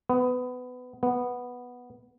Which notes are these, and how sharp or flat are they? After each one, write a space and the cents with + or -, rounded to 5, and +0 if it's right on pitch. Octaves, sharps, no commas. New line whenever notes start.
B3 +20
B3 -5